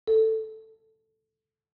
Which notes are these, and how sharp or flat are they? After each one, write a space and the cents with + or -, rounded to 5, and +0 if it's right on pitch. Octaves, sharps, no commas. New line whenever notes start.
A4 +0